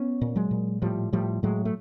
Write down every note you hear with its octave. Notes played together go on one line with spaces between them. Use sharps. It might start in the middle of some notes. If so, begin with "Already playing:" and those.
Already playing: B3 C#4
A#2
F#3 G#3
A#2
A2 F3 G3
A2 F3 G3
A2 F#3 G#3
A3